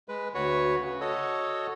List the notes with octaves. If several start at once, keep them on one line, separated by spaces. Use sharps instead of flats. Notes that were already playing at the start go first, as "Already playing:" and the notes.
G#3 B4
D2 F#4 B4 C#5 C#6
C#3
F#4 A4 C#5 D#5